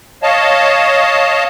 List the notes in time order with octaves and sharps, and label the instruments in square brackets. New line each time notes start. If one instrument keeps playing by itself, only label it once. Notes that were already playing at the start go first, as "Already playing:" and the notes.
[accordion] C#5 D#5 F5 A5